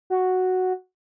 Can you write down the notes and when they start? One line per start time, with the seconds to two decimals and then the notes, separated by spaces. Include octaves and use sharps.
0.10 F#4